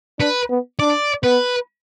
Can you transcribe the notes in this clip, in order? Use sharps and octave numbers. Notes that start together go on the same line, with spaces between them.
D4 B4
B3
D4 D5
B3 B4